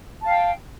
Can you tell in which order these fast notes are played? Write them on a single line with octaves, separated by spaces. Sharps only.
A5 F5 G5